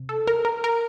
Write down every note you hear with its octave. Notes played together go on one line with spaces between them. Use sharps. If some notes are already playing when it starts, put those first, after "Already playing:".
Already playing: C3
A4
A#4
A#4
A#4